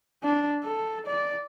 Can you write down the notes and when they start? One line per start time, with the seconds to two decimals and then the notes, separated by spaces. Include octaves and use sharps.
0.23 D4
0.63 A4
1.06 D5